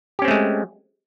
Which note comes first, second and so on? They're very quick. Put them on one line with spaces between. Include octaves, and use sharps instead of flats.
G4 C#4 C4 A3 G#3